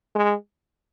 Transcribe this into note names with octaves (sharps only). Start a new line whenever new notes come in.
G#3